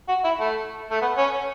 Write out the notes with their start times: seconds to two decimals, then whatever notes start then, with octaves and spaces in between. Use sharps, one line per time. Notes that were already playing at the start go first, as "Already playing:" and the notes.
0.08 F#4
0.24 E4
0.39 A3
0.91 A3
1.01 B3
1.17 C#4